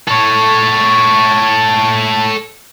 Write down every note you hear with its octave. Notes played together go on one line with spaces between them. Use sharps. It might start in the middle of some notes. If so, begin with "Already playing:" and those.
A4 C#5